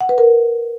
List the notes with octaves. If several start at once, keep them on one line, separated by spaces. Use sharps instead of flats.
F#5
B4
A#4